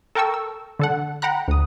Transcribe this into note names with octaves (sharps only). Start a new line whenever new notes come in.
A4 A#4 G5 A5 C#6 E6
E6
D3 A4 F#5
F#5 G5 A#5 B5 F#6
D2 D#6